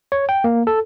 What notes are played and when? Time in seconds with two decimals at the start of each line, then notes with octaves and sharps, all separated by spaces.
0.12 C#5
0.29 G5
0.44 A#3
0.67 A4